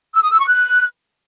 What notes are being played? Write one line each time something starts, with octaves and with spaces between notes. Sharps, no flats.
E6
D#6
E6
C#6
F#6